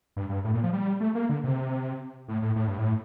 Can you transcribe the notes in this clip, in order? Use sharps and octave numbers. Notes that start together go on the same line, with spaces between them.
G2
G2
A2
A#2
F3
G3
A3
A#3
D3
C3
A2
A2
A2
G2
A2